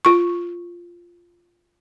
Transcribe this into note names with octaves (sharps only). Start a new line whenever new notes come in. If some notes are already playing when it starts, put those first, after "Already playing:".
F4 C#6